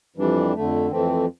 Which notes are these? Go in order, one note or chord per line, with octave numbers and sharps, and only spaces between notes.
F2 E3 G3 D4
F2 D3 A3
F2 E3 A3 C4